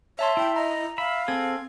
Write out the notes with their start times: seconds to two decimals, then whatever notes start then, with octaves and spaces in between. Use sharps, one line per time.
0.19 C#5 E5 A5 C6
0.37 E4 G5
0.56 D#5 A#5
0.98 E5 F5 B5
1.28 C4 G#4 A4 G#6